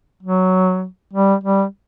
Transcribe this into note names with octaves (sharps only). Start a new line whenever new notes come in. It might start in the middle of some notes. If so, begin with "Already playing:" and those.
F#3
G3
G3